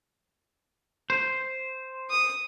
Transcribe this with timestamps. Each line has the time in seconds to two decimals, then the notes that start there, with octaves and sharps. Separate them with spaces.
1.10 C5
2.10 D#6